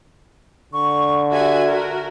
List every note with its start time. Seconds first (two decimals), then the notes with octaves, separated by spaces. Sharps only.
0.73 D3 C#6
1.32 F#4 G4 E5 G#5
1.66 F#4 A#4